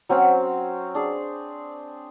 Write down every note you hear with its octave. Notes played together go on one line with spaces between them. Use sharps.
F#3 C4 C#4
D4 G#4